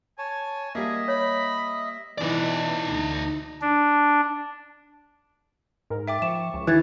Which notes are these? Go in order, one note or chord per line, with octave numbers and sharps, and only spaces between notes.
C#5 G#5 A5
G3 A#3 G#4 D#5 E5
C#5 B5
B2 E3 D#4 D5
D2
D4
G#2 A#4
E5 G5 D6 A6
F3 C#6 E7
C#2
D#3 E3 F#6 G#6 A6